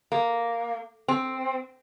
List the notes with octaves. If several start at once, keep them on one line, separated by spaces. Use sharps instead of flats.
A#3
C4